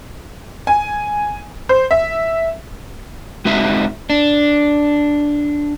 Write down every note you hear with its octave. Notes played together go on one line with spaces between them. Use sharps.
G#5
C5
E5
G#3 C4 D#4 F#4 B4 E5
D4